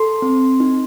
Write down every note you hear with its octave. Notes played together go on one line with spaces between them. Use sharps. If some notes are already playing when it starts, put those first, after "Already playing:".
Already playing: A4 C6
C4
D#4